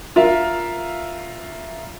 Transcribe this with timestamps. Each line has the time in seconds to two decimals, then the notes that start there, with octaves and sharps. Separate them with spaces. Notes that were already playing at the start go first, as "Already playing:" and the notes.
0.16 F4 A#4 E5 F5